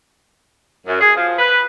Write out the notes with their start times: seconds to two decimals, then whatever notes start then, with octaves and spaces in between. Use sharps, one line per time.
0.87 F#2
1.01 G#4
1.16 F3
1.38 B4